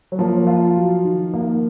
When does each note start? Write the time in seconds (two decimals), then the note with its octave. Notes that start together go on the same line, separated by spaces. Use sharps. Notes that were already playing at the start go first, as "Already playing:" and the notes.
0.12 F#3
0.19 F3 A#3
0.47 F4
0.77 F#3
1.05 D#3
1.34 A#3